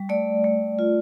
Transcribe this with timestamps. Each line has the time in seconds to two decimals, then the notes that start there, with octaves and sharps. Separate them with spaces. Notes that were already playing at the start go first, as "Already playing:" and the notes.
Already playing: G3
0.09 A3 D5
0.44 A3
0.79 F4